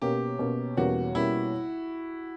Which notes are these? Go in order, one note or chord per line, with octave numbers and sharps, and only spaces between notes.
B2 A#3 C#4 G4
B2 A#3 C#4
E2 B2 G3 A#3 C#4 F#4
B2 G3 A#3 C#4 E4